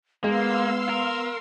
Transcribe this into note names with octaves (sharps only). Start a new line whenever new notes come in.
G#3 A#3 B3 F5 C6 E6
A#4